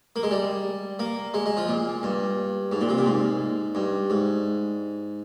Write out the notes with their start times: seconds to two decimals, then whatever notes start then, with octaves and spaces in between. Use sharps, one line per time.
0.16 A#3
0.23 G#3
0.31 G3
0.99 A#3
1.34 G#3
1.46 G#3
1.57 F3
1.68 A#2
2.03 G2
2.72 G#2
2.81 A#2
2.89 C3
2.98 A#2
3.06 G#2
3.75 G2
4.10 G#2